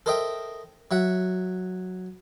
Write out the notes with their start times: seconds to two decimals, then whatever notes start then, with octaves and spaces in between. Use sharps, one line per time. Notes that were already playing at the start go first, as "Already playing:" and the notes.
0.06 A4 A#4 C5 D#5 E5 G5
0.91 F#3 E5 F#5